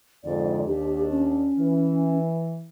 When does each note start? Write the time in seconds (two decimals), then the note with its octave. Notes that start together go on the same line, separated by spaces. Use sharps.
0.24 F2 G#2 D3 D5
0.66 D#2 D4 G4
1.11 C#4
1.58 E3